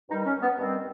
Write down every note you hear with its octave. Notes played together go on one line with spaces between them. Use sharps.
G2 D#3 G3 D#4
C#4
B3
G2 D#3 G3 C4